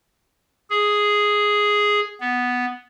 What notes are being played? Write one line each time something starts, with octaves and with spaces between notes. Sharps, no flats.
G#4
B3